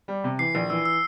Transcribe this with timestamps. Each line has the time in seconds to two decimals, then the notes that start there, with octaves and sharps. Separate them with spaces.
0.08 G3
0.24 C3
0.39 E3 C7
0.55 A#1
0.70 E3 E6
0.85 E6